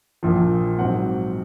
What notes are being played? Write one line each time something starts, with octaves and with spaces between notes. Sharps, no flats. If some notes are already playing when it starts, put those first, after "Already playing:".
A#1 A#2 F3
G#2 F#3 C4 F#5